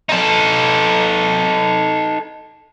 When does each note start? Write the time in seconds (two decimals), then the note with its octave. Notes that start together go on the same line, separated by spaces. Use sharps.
0.09 D#4 A4